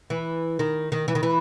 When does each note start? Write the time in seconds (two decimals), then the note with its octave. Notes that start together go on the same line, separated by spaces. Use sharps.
0.10 E3
0.59 D#3
0.92 D#3
1.08 E3
1.15 D#3
1.23 E3